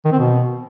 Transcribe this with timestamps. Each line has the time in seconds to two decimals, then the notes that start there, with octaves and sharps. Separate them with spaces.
0.05 D#3
0.12 C4
0.19 B2